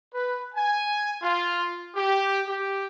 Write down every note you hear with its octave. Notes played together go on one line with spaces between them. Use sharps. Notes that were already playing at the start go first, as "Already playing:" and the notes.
B4
G#5
F4
G4
G4